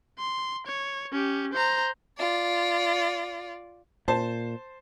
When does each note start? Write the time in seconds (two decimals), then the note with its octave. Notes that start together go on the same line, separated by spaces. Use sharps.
0.19 C6
0.67 C#5
1.12 C#4 G4
1.54 C5 A#5
2.18 F4 D5
4.08 A#2 C5 A5